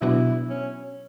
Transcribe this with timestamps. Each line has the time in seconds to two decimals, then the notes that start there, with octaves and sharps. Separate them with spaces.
0.01 B2 F#3 B3 D4 E4 F#4
0.50 C#4